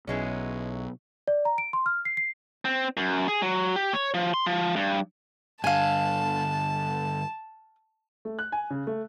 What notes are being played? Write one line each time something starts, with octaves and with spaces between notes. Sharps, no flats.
B1 E3 G#3 C#4
D5
A#5
D7
C6
F6
C7
C7
C4
F#2
G#4
F#3
G4
C#5
F3
C6
F3
G2
G2 D3 F5 G#5 A5
A3
F#6
G#5
C#3
A3